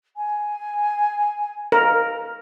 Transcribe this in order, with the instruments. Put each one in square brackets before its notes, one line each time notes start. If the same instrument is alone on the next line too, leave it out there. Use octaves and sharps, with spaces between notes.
[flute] G#5
[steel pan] A#4